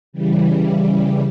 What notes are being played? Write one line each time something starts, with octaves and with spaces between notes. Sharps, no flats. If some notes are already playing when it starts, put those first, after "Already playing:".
C#3 E3 G3